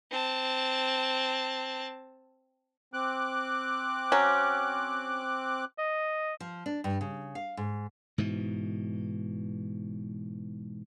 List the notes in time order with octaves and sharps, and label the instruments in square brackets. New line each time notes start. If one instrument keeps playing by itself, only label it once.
[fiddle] C4 A5
[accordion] C4 D6 F#6
[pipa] F#3 C#4
[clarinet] D#5
[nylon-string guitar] F3
D4
G2
C#3
F5
G#2
[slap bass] G#2 B2 E3